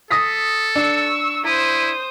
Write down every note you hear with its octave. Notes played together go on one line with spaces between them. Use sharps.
A4 D#6 A#6 B6
D4 C#6 E6
E4 C5 D#6